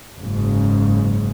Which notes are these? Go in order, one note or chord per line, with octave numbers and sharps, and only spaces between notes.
F#1 G#2 C#3